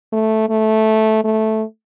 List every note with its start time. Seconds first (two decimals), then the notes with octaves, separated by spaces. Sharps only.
0.13 A3
0.49 A3
1.24 A3